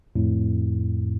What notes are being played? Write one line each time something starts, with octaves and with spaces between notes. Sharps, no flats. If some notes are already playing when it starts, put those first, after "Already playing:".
F2 A2